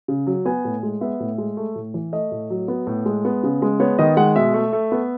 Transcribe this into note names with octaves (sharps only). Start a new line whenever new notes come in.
C#3
F#3
B3 G#5
A2
G#3
B3 E5
A2
G#3
A3
A2
E3
A3 D#5
A2
F#3
B3
A2
G#3
B3
C#3
G#3
B3 C#5
D#3 D#5
G#3 F#5
B2 E5
A3
A3
B3